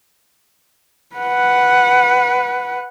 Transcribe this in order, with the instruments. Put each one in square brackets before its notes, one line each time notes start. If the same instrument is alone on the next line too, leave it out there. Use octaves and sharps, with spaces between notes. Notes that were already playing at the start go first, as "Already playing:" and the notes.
[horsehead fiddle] B4 F#5